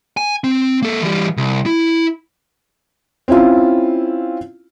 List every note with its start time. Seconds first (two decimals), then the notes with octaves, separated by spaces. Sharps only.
0.17 G#5
0.44 C4
0.82 A#3 A4
1.02 E3 G3
1.37 C2
1.66 E4
3.28 C4 C#4 E4 F4